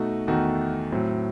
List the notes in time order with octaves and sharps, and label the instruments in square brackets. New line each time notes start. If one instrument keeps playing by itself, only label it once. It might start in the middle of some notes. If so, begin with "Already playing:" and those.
Already playing: [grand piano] B2 A3 D#4 F#4
E2 D#3 A3 D#4 F#4
A2 F#3 C4